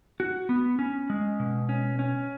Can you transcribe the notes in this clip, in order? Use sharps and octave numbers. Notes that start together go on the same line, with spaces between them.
F#4
B3
C#4
G#3
B2
C#4
C#4